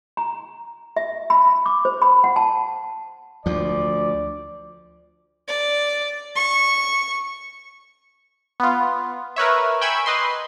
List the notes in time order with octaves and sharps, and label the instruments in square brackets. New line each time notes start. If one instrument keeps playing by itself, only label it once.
[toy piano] A#5
E5
B5
D6
C5
B5
F#5
A5
[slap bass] D2 F3 [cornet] D5
[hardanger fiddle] D5
C#6
[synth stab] B3 F4
A#4 B4 C#5 E5
G5 G#5 B5 C#6 E6 G#6
B4 D#5 C6